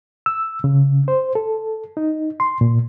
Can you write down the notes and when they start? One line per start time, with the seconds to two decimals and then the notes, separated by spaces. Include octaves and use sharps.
0.26 E6
0.64 C#3
1.08 C5
1.35 A4
1.97 D#4
2.40 C6
2.61 A#2